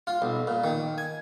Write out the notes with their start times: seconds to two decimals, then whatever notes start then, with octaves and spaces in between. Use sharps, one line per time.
0.07 F4
0.22 B1
0.47 A#2
0.64 D#3
0.98 G#5